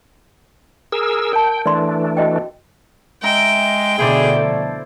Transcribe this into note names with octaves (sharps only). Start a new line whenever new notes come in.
G#4 A#4 E6
A#4 G5 A5
E3 A3 D4 D5 C6
F#4 D#5 G5
G#3 E5 G5 A#5
B2 D3 A3 E4 G#4 C5 D5
F3